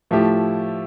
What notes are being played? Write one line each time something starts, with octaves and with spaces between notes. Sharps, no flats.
A2 F3 A3 E4 G4